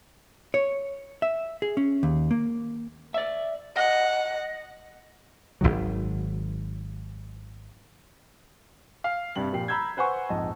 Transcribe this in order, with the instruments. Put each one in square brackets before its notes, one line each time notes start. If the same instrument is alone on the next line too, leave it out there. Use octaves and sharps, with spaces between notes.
[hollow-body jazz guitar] C#5
E5
G#4
C#4
D#2
A#3
[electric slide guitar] D5 E5
[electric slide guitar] D#5 [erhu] F#5
[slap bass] G#1 C#2 D#3 F#3
[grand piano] F5
G2 C3 G3 F#7
A#2 F3 G4 C7
A#5 B5 E6 G6 G#6
B4 C5 F#5 G#5 C#6
A#1 F2 G#2 D#5 A5